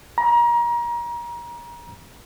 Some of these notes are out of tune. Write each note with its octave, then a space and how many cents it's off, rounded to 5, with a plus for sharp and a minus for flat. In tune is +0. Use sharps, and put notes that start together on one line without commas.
A#5 +30